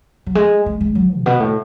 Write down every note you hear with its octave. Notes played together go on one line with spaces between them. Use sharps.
F#3
G#3
G#3
G#3
F#3
A2
B2
A2